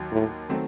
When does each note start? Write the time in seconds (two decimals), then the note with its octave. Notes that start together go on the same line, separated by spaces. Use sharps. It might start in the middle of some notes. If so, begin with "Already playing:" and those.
Already playing: D#2 D#3 F#3
0.12 A2
0.49 D#3 F#3 A3 C4